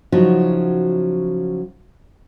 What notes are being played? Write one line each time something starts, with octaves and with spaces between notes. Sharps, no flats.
C#3 F3 F#3 D#4 E4 F#4